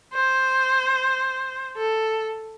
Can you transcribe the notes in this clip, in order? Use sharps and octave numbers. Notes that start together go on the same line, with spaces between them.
C5
A4